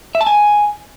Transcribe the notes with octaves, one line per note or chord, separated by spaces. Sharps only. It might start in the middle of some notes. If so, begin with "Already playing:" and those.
E5
A5
G#5